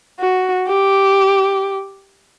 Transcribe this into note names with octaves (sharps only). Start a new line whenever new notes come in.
F#4
G4